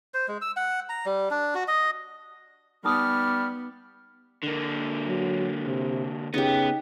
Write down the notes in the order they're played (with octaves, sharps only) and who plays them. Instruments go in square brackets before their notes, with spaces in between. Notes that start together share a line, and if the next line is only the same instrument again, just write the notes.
[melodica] C5
G#3
E6
F#5
A#5
G3
D4
F#4
D#5
[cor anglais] G3 [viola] B3 [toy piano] D#4 D#6 [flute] F6
[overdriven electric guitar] D3 A#3
[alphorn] F#3
C3
[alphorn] C#3 [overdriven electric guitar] B3 [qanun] D#4 G4